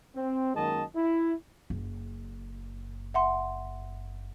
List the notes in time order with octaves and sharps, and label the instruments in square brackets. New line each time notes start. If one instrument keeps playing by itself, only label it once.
[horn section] C4
F#2 D#3 G#3 A#3 D#5 A5
E4
[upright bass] F#1
[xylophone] E5 F#5 C6